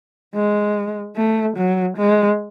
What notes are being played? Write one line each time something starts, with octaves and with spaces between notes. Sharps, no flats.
G#3
A3
F#3
G#3